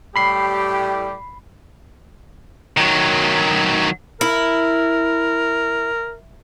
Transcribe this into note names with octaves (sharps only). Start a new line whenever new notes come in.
A2 G3 G4 B5 C7
D#3 F#3
E4 A#4